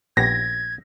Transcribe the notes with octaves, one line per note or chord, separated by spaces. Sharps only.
A#1 B3 G4 G#6 A#6